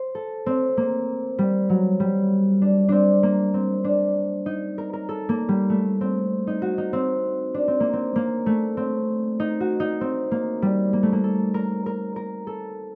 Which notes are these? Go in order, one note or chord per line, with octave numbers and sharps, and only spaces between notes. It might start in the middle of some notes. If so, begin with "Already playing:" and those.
Already playing: C5
A4
C4
A#3
G3
F#3
G3
D4
C4 D4
A#3
C4
D4
D#4
A#4
A#4
A4
A#3
G3
A3
C4
D#4
F#4
D#4
C4
D4
C4
A#3
C4
A#3
A3
C4
D#4
F#4
D#4
C4
A#3
G3
A#3
A3
A#3
A4
A#4
A#4
A#4
A4